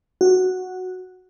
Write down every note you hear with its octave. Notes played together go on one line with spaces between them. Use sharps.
F#4